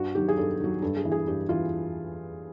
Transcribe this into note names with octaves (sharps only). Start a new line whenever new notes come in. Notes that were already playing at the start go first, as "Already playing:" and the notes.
Already playing: G2 F#4
D#3 F#3 G4
G#4
G2 A4
D#3 F#3
G2 A4
G#4
E3
G#4
G2 G4
E3 F4